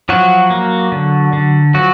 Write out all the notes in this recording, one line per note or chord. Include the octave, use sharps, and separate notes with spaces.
F3 F#3 F#4
A#3
D3
D3
F3 F#3 F#4